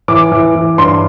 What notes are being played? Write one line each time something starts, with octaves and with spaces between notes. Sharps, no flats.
E3 D6
E3
E3
G2 C6